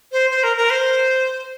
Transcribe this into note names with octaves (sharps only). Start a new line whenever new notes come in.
C5
C5
A#4
A#4
C5